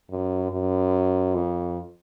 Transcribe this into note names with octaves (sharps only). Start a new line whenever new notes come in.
F#2
F#2
F2